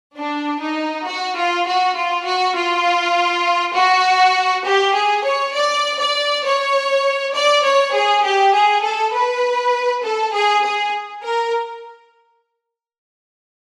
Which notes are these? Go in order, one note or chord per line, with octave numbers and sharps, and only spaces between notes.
D4
D#4
F#4
F4
F#4
F4
F#4
F4
F#4
G4
G#4
C#5
D5
D5
C#5
D5
C#5
G#4
G4
G#4
A4
B4
A4
G#4
G#4
A#4